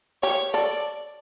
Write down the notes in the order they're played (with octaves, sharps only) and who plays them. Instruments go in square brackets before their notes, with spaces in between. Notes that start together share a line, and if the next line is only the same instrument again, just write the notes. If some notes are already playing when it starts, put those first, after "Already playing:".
[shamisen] G4 [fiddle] C#5
[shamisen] A4 [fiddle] D5